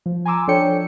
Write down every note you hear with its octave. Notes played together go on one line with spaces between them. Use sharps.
F3
G#5 A#5 C6 D6 E6
F3 D4 A4 C#5 G5 C#7